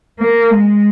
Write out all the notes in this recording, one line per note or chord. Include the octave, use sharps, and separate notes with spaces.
A#3
G#3